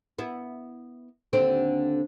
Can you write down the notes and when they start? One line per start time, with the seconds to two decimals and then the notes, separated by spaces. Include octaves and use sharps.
0.19 B3 E4
1.33 D#2 D3 C4